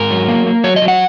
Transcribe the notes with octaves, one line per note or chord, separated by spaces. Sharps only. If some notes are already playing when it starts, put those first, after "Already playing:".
Already playing: G#2 A#4
F#3
A#3
A#3
F#3 C#5
D#5
F#3
F#5